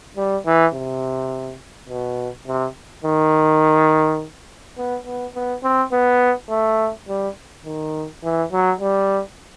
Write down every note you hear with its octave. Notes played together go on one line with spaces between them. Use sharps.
G3
E3
C3
B2
C3
D#3
B3
B3
B3
C4
B3
A3
G3
D#3
E3
F#3
G3